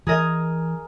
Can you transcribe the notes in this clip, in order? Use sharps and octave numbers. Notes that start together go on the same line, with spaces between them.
E3 G#4 A#4 D#5